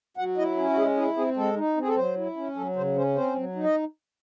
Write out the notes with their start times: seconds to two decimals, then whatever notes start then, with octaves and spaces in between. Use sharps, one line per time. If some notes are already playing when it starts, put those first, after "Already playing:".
0.17 F#3 F#5
0.37 E4 D#5
0.57 C#4
0.70 F#4
0.77 G#3 G#4
0.97 E4 G#4
1.17 C4 G#4
1.37 G#3 A4
1.56 D#4
1.77 C4 G#4
1.88 A4
1.97 F#3 C5
2.17 E4
2.37 C#4
2.56 F#3 A4
2.76 C#3 C5
2.96 C#4 C5
3.16 C4 C5
3.36 F#3
3.56 D#4
3.64 D#5